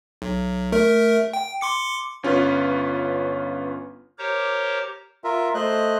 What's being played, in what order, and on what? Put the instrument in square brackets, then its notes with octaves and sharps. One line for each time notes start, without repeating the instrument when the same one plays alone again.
[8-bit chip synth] B1
A3 A#4 E5
G5
C6 D6 C#7
[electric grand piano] G1 C#4 F4 B4 F6
[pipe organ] G4 A#4 C5 C#5 A#5 D6
[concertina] F4 A#4 E5
A3 C5 D#5 F#6